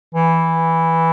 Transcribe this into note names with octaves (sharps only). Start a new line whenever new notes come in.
E3